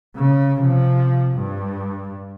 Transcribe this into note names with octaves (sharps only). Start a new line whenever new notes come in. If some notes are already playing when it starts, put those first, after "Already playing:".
C#3
C3 F3
G2